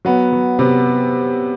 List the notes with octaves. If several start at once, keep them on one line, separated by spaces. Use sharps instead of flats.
F#3 B3
F#3
C3 B3